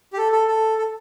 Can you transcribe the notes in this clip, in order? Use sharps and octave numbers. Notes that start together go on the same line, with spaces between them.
G4
A4
A4
A4
A4